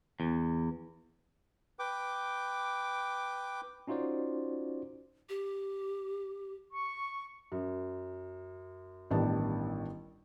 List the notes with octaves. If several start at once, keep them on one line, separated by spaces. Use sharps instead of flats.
E2
B4 G5 D6
C#4 D#4 F4 F#4 C5 D5
G4
C#6
F#2
A1 G2 D#3 B3 D4 A5